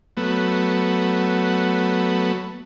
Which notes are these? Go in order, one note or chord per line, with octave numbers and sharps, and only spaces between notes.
F#3 A3 B3